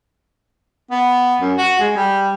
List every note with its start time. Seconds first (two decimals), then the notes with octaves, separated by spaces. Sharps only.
0.91 B3
1.41 F#2
1.58 F#4
1.79 G#3
1.96 G3